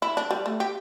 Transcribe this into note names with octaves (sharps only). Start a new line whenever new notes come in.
E4
D4
G3
A3
G4